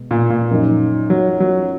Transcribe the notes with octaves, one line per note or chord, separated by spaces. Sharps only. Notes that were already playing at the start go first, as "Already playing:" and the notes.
Already playing: B2 G#3
A#2
A#2
F#2 F3 A#3 D#4
F#3
F#3